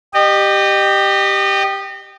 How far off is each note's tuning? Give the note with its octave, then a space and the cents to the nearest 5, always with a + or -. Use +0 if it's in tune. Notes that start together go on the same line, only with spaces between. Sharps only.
G4 +0 D#5 -30